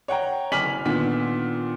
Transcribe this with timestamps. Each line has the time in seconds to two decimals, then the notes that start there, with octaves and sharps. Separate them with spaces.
0.08 C#5 F#5 G5 A#5
0.52 F#1 G#5 D6 F6 B6 F#7
0.85 A#2 D3 D#3 B3 B6